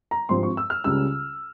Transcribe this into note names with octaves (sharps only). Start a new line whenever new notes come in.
A#5
G#1 G2 F3 C4 C6
C#6
E6
F6
C#2 C#3 G3 E6